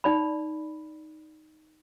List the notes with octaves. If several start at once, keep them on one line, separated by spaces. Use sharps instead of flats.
D#4 D5 B5